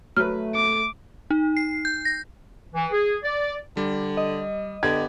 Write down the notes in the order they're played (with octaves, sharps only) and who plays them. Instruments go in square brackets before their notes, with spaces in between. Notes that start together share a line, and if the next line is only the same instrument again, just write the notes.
[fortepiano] F#3 B4 [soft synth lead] A3 [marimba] F6
[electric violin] D6
[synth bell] D#4
C7
G6
A#6
[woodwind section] E3
G#4
D5
[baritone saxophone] D3 [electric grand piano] G3
[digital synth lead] D#5
[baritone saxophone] D3 [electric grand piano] B3 G4 [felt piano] G#6